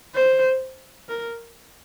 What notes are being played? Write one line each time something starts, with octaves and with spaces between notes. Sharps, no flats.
C5
A#4